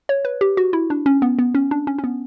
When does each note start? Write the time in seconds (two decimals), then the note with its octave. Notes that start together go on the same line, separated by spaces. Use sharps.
0.09 C#5
0.25 B4
0.41 G4
0.57 F#4
0.73 E4
0.90 D4
1.06 C#4
1.22 B3
1.39 B3
1.55 C#4
1.71 D4
1.87 C#4
1.98 C#4
2.04 B3